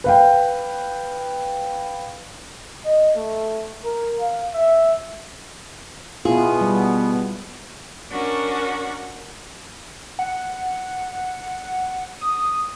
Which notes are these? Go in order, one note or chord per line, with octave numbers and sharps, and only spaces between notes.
B4 F5 G5
D#5
A3
A#4
F5
E5
B2 B3 E4 F4 G#4
G3
C#4 D4 F#4 A#4
F#5
D#6